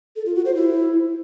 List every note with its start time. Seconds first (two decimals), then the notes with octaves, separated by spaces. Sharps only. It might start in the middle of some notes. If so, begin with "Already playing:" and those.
0.16 A4
0.26 F4
0.36 F#4
0.45 C5
0.55 E4